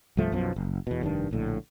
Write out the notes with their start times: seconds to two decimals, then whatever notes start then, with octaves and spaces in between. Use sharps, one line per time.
0.17 C2 G2 F3 A3
0.32 B1 F#2 B2 F3
0.56 F#1
0.87 E2 B2
1.01 F1 G2 D#3 D4
1.31 A#1 A2 D3